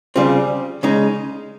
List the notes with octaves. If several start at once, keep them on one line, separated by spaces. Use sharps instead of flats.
C#3 G3 C4 F4
C#3 G#3 D#4